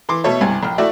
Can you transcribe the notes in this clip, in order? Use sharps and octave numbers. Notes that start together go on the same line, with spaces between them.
E3 C6 D6
B2 A3 A4 C#5 E5
C2 G2 G#5
A#1 G5 F6
A3 E4 F#4 D5 E5